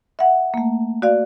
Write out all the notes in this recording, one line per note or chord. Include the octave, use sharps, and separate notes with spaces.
E5 F#5
A3 A#3
F#4 D5 F5